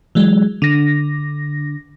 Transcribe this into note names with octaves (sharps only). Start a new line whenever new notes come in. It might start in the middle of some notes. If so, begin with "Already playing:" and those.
E3 F#3 G#3
D3 A#6